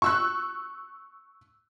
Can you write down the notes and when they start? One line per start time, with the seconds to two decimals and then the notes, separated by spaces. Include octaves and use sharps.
0.02 C#6 E6 F#6